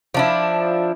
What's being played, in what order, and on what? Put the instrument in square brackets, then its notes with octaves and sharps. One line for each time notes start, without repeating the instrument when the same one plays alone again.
[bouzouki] F3 D4 E4